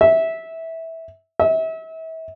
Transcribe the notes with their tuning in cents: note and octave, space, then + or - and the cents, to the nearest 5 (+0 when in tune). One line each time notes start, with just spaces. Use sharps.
E5 -15
E5 -35